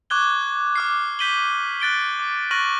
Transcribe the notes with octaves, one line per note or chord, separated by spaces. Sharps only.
C#6 D6 F#6 G#6 G7
D6 F6 C7
G6 B6 D#7 F#7 G7
F#6 A6 D7 G7
D6
C#6 F6 F#6 A#6 D#7 F#7